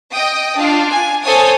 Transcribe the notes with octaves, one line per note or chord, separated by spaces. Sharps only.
D#5 G5 D#6
D4 F4
G#5
A4 C5 C#5 G#5 D#6